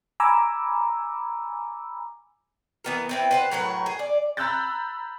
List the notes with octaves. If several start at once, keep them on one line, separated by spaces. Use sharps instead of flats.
G#5 A#5 B5 D6 E6
E3 B3 A#4
B3 C4 E4
B4 C5 F#5
A2 F#3 A#4 B4
G#4
D5
A#5 B5 E6 F#6 G6 A6